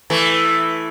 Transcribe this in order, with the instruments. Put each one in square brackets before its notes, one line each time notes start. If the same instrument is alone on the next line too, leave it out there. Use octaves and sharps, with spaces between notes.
[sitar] E3 A3